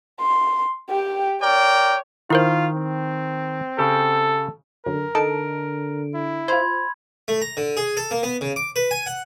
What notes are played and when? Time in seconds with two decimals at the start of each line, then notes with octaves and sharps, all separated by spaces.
0.20 C6
0.90 G4 G5
1.41 A#4 C#5 D5 G5
2.30 D#3 E4 F4 A#4 C5
2.75 C4
3.78 C#3 G4 A4
4.86 F#2 D3 A#4
5.15 D3 D#4 A4 A5 D7
6.14 E4
6.48 F4 C5 B5 C6 G#6
7.28 A3
7.42 A#5
7.57 D3
7.77 G#4
7.97 A4
8.11 A#3
8.23 B3
8.41 C#3
8.56 D6
8.76 B4
8.91 G#5
9.06 F#5